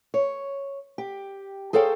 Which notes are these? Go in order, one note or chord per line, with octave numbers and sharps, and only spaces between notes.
C#5
G4
G#4 A4 C5 C#5 F5 G5